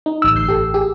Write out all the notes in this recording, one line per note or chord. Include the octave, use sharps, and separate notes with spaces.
D#4
A1 E6
G1 G6 C7
G4 A4
G4 G#4